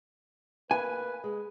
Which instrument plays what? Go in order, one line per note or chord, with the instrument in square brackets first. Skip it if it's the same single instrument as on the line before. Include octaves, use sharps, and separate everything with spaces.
[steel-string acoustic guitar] A#3 [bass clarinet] B4 [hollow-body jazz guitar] G#5
[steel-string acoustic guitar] G#3